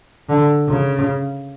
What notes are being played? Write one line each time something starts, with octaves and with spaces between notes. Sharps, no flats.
D3
C#3